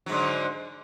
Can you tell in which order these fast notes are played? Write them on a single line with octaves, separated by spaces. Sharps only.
F#3 G#2 D3